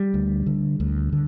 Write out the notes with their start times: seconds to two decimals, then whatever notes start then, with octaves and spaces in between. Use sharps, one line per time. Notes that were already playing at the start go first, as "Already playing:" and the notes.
Already playing: G3
0.14 D2
0.46 D3
0.80 D2
1.13 D3